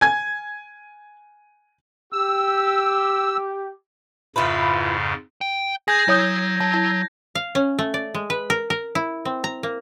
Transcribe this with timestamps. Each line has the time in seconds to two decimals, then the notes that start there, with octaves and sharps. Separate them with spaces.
0.01 G#5 G#6
2.13 G4 E6
4.36 F2 G#2 C#3 E4 F4 B4
5.41 G5
5.88 G#4 G#5 G6 G#6 A#6
6.08 F#3 E4 C#5 D#6
6.60 F#3 A5
6.74 E4 A5
7.35 F5
7.55 C#4
7.79 A3
7.94 D5
8.15 G#3
8.30 B4
8.50 A#4
8.70 A#4
8.95 E4
9.25 C4
9.44 A#5
9.63 A#3